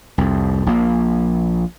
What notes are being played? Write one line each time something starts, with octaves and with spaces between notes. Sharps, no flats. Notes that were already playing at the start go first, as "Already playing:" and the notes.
C2 F2
A#1 A#3